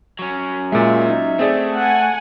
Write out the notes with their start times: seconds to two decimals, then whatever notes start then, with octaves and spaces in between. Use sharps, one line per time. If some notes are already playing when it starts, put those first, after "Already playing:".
0.19 F#3 C#4
0.72 A#2 G#3 E5
1.09 D#4
1.39 A3 C4 G#4 D5
1.75 F#5 G#5